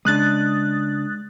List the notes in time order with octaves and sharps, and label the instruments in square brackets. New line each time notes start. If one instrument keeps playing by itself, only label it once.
[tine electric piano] C#3 D4 [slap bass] G#3 [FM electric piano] D#6 F#6 A6